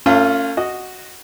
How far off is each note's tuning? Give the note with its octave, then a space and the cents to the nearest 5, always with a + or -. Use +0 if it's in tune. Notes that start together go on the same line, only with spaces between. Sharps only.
A3 +45 C#4 +0 F4 +0
F#4 +0 D#5 -5